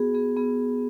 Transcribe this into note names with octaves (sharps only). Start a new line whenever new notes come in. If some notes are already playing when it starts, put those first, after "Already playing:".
Already playing: B3 F#4 G#4
B3 G#4
B3 G#4